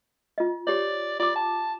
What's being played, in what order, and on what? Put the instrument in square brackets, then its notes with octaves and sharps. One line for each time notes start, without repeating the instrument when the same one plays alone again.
[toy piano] F4 D#5
[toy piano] G4 C#5 [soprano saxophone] D5
[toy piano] F4 D6 [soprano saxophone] D5
[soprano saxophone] A5